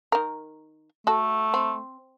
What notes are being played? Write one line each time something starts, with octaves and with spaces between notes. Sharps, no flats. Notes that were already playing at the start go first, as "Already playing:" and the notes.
D#3 A#4
A3 F#4 A4
C4